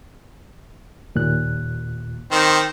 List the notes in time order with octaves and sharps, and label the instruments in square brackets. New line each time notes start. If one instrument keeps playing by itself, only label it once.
[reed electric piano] D#2 A#2 F#6
[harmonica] D#3 C4